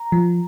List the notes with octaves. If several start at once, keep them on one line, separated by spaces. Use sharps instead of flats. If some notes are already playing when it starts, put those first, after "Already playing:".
Already playing: A#5
F3